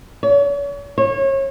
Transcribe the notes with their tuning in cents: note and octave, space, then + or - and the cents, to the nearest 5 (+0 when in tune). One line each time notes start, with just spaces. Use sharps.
C#5 +40
C#5 -30